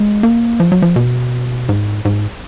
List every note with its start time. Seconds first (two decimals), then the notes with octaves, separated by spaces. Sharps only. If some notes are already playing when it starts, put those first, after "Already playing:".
Already playing: G#3
0.23 A#3
0.60 F3
0.72 F#3
0.82 F3
0.96 B2
1.69 G#2
2.05 G#2